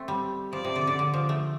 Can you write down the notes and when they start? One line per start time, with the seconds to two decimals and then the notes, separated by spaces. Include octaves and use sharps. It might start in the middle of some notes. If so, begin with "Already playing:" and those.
Already playing: A3 C4
0.08 G3
0.53 F3 D5
0.65 C3
0.76 D3
0.87 D3
0.99 D3
1.14 F3
1.29 A3